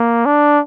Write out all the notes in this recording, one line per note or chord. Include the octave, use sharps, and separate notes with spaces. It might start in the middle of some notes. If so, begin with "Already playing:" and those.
Already playing: A#3
D4